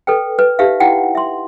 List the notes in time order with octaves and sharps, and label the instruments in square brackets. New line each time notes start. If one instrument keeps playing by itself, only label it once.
[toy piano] A4 B4 G5
B4
D#4 G4 B4 E5 F5
D#4 E4 F#4 F#5 G5
E5 C6